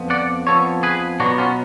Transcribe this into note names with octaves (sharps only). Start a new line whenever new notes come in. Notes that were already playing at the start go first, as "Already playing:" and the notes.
Already playing: F2 F3 B3
D5 F#5
F2 F3 B3 A4 C#5
G#4 B4
B2 F#3 B3 D4 F#4
C#4 F4